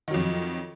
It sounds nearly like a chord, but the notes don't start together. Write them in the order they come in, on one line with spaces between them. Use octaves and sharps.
D#3 F#3 F2